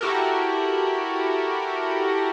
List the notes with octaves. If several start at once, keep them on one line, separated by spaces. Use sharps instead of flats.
E4 F#4 G4 A4 A#4